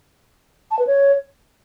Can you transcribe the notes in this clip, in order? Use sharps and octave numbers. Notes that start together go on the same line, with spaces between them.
A5
B4
C#5